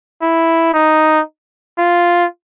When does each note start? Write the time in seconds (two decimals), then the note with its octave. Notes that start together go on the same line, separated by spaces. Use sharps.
0.22 E4
0.73 D#4
1.78 F4